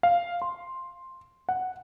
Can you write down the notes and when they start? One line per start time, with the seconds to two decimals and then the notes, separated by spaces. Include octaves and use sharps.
0.03 F5
0.42 C6
1.49 F#5